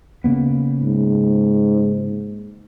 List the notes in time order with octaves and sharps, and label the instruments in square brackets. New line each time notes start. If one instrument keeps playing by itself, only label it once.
[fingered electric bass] C#3 A#3 B3
[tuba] G#2